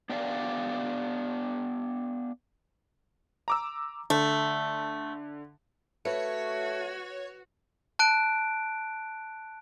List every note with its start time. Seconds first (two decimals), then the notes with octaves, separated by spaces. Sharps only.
0.10 B3 D4 G4 D5 D#5 F5
3.48 A#5 D6 E6
4.10 D3 A3
6.05 A3 F#4 B4 C#5
7.99 A5 F#6 D7